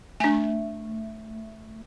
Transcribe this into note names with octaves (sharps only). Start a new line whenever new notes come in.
A3 D4 G#5